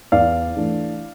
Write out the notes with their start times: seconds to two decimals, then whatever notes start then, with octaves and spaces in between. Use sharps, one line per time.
0.12 E2 D5 F5
0.57 E3 A3 D4